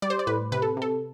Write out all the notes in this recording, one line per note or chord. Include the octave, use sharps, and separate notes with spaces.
G3 D5
C5
D5
A2 B4
C3 B4
A4
C3 A4